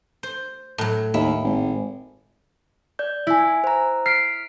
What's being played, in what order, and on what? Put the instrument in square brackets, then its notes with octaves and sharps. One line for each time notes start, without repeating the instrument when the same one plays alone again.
[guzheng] C5
A2 F#3
[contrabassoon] D#2 [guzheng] E4
[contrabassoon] G#1
[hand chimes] D5 G6
[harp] E4 [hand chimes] E5 G#5
[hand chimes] C5 A#5
[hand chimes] F6 B6 D7 [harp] C7